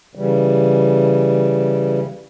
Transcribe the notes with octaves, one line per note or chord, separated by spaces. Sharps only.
C#3 E3 G3